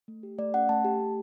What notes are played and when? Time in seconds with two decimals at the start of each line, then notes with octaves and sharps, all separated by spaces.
0.08 A3
0.23 G4
0.38 A3 D5
0.54 C#4 F#5
0.69 A3 A5
0.85 G4
1.00 A3